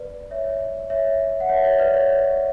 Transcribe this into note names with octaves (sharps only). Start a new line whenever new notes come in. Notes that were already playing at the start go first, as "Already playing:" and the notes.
Already playing: B4 D5
C#5 E5
C#5 E5
F#5
C#5 E5
C#5 E5
B4 D5
C#5